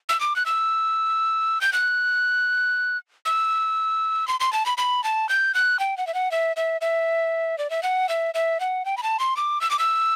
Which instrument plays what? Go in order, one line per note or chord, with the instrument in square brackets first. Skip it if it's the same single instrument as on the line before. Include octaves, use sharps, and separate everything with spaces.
[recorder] E6
D6
F#6
E6
G6
F#6
E6
C6
C6
A5
B5
B5
A5
G6
F#6
G5
F#5
E5
F#5
E5
E5
E5
D5
E5
F#5
E5
E5
F#5
G5
B5
A5
C6
D6
E6
D6
E6